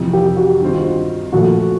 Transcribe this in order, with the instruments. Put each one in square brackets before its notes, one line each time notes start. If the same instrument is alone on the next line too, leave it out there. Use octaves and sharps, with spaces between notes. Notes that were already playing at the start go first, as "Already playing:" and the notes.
Already playing: [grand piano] F2 C3 E3
[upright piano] G4
F#4
[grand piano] G2 D#3 G3 C4 F4
[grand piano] A#2 F3 A3 [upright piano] F#4